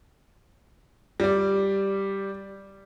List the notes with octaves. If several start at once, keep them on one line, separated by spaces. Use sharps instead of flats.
G3 D5